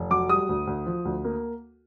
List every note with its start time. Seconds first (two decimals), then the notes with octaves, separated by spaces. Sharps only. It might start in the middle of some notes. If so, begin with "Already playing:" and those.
Already playing: F1
0.10 F#3 D6
0.29 G3 D#6
0.49 D2
0.67 D2
0.86 F3
1.05 D2
1.24 A#3